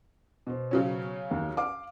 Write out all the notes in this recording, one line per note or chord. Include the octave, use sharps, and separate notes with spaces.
B2 C5
C#3 F#3 C#4
D#2
F5 D6